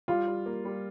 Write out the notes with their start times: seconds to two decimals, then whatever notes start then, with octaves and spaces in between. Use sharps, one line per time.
0.08 G3 F4
0.27 G3
0.46 A#3
0.65 G3